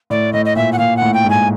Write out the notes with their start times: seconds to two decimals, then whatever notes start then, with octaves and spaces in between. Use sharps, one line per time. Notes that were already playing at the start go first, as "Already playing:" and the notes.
0.10 A2 D5
0.33 A2 D#5
0.46 D#5
0.56 A#2 E5
0.73 F#5
0.79 A#2 F5
0.97 A2 F#5
1.14 G5
1.25 G#2
1.30 G#5